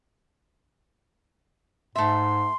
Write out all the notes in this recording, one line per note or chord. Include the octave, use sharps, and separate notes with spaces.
G#2 A3 E5 C6